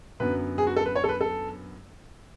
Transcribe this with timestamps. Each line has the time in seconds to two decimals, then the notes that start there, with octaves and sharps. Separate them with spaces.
0.20 F#2 D3 F#3 B3 B4
0.58 G#4
0.67 F#4
0.76 A4
0.86 B4
0.96 C#5
1.04 A4
1.09 B4
1.21 A4